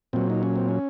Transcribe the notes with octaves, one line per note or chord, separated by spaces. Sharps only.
A#2 F#3 C4
D#4
C#4
C4
C#4